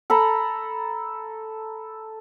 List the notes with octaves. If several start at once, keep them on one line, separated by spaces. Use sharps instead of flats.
A4 A#5 B5